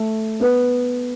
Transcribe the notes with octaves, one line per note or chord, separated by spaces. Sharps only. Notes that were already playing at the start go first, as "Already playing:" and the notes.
Already playing: A3 A4
B3 B4